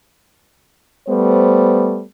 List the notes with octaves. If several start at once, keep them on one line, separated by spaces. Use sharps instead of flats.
G3 A3 B3 C5